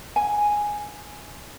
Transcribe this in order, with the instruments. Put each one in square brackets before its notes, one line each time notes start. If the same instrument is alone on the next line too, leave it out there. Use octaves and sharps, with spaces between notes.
[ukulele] G#5